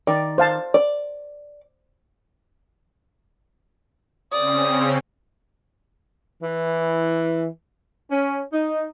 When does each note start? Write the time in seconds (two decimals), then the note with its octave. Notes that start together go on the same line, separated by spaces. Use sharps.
0.07 D#3 D5
0.38 C5 F5 A5
0.74 D5
4.32 C#3 C4 C#4 D5 D#6
6.42 E3
8.11 C#4
8.52 D#4